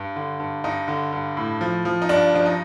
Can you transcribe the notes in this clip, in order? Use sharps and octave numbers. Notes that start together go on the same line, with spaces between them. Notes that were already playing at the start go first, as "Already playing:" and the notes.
Already playing: G2
D3
G2
G2 D#4
D3
G2
A2
F3
F3
D#4
G2 D4
F3 D4
D#4